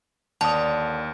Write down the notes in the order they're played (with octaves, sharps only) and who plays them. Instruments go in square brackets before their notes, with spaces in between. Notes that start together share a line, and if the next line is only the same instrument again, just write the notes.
[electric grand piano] D#2 D#6 [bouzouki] D3 [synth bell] A5